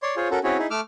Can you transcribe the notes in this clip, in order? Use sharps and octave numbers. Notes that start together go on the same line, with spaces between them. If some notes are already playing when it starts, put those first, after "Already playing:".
C#5 D5 C6
F4 G#4 C5 C#5
C#4 F#4 A4 A#4
C4 C#4 E4 F#4 G#4 C#5
D#4 E4 G#4
A3 D6 E6 F6